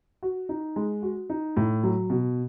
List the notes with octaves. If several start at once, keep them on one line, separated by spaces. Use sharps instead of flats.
F#4
D#4
G#3
F#4
D#4
A2
F#3
B2